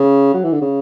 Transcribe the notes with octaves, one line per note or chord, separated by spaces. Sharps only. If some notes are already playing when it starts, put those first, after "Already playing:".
Already playing: C#3
F#3
E3
D3
C#3